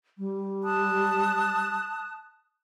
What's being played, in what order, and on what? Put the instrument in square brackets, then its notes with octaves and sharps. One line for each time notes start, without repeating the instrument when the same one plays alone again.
[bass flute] G3
[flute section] A5 D#6 F#6